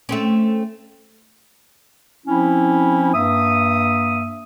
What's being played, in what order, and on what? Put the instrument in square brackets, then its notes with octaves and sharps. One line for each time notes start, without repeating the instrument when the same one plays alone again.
[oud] A3 C4 C#4
[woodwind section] F3 C4 C#4 E4
G2 A#3 E5 D#6